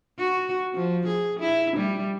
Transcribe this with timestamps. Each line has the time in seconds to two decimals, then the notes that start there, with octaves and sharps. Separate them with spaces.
0.19 F#4
0.75 F3
1.07 G#4
1.40 E4
1.77 G3